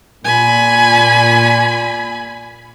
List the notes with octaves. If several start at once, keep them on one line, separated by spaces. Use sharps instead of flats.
A#2 G#5 B5